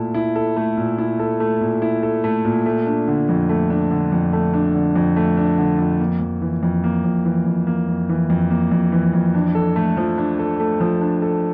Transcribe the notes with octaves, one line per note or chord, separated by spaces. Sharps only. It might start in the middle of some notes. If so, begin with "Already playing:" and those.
Already playing: A#2 A3 E4 A4
E4
A4
A3
A#2
E4
A4
A3
A#2
E4
A4
A3
A#2
A3
D4
D3
F2
A3
D4
D3
F2
A3
D4
D3
F2
A3
D4
D3
F2
A#3
F2
E3
F2
A#3
F2
E3
F2
A#3
F2
E3
F2
A#3
F2
E3
F2
D4
A4
A3
F3
D4
A4
A3
F3
D4
A4